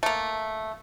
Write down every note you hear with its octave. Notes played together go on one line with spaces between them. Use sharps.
A3 A#3